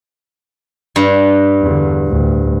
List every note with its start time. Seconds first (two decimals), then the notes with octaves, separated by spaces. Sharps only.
0.96 G2
1.61 E2 D3
2.04 D2 A2